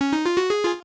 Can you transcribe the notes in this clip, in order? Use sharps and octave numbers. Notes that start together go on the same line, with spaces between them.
C#4
D#4
F4
F#4
G#4
F4